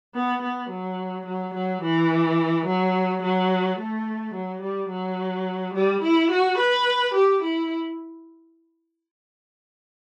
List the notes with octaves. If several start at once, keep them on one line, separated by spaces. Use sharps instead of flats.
B3
B3
F#3
F#3
F#3
E3
F#3
F#3
A3
F#3
G3
F#3
G3
E4
F#4
B4
G4
E4